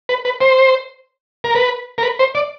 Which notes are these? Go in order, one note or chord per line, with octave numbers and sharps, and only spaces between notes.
B4
B4
C5
A#4
B4
A#4
B4
C5
D5